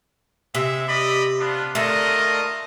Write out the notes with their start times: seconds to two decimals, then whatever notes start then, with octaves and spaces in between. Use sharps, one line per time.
0.55 C3 G#3 E5
0.89 D5 D#5 B5
1.39 B3 D4 F4
1.75 D3 A3 F4 A#4 D#5